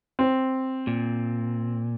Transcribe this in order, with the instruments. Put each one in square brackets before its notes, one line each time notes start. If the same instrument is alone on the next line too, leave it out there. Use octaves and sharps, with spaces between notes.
[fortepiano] C4
[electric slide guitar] A#2